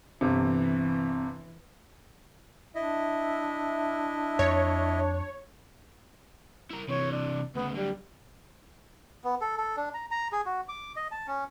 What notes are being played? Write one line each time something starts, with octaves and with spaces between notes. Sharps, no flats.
G1 C3 E3
D4 E4 D#5 E5
F2 C#5
E4 A#4
C3 E3 C#5
D4
D2 C#3 B3
D3 F#3 G3
B3
A4
A4
D4
A#5
A#5
G#4
F#4
D6
D#5
A5
C#4